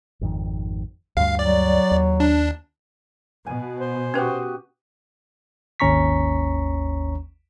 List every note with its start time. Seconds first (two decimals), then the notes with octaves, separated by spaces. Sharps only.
0.21 G#1 F2 D#3
1.17 D2 G2 G3 F5
1.39 F#3 D5
1.91 D#2
2.20 D4
3.47 B2 G#5
3.80 C5
4.14 C#4 F#4 G4 B4 D#5
5.80 G#1 D#2 C#4 A#5 C#6 B6